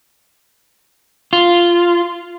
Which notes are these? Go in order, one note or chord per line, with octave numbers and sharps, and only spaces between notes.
F4